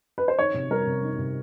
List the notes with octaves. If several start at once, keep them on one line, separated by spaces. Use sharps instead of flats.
B4
C5
D#3 C#5
C3
G3 A#4
C3
D#3
C3